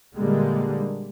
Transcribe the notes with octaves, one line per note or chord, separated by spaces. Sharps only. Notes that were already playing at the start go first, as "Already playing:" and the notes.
A#2 D3 G3 G#3 A#3